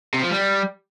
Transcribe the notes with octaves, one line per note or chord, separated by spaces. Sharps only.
C3
F3
G3